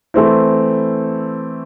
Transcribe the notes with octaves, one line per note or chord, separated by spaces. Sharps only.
E3 A3 C4 E4